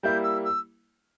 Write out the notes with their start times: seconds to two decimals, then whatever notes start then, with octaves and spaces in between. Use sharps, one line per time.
0.03 G3 A#3 E4 G6
0.23 E6
0.45 E6